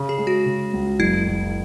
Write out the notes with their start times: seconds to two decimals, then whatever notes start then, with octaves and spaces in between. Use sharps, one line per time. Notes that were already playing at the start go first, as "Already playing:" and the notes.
Already playing: C#3
0.09 G#4
0.18 G#3
0.27 F#4
0.46 C#3
0.73 C#2
0.99 F#1 E4
1.28 F#1